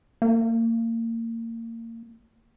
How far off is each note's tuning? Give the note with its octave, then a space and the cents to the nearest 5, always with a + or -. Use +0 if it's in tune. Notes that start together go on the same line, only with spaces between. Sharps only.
A#3 -30